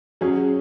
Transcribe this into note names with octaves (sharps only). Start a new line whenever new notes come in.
F#3 C#4 G#4